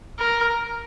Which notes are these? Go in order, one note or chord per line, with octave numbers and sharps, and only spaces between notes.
A#4